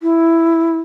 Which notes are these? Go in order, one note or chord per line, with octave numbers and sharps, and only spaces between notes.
E4